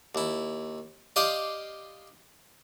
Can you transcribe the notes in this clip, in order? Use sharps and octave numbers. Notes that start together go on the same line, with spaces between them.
D#2 E4
G4 D5 D#5 F5 G5 C6